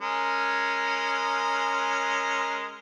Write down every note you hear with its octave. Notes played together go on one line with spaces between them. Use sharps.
G#3 C#4 A#4